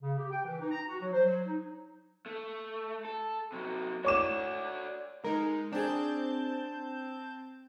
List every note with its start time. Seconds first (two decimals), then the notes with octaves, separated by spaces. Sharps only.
0.02 C#3
0.18 G4
0.31 G5
0.45 E3
0.60 D#4
0.71 A#5
0.88 F#4
1.01 F#3
1.13 C5
1.25 F#3
1.46 D#4
2.26 A3
3.05 A4
3.52 C3 F#3
4.05 D4 F#4 C#5 D6 E7
5.24 G#3 D#4 A#4
5.72 C4 D4 G#4 A5 G6